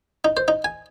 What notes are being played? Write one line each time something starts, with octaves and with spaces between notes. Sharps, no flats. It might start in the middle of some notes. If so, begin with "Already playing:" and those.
D#4
C5
D#4
G#5